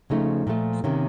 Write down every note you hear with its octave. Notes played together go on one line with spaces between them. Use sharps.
C#3 F3 A3 D#4
A#2 F3 A3
C3 D#3 A#3 C#4